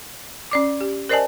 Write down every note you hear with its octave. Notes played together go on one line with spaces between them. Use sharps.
C#4 D5 D6
G4
A#4 C5 D5 D#5 G#5 A5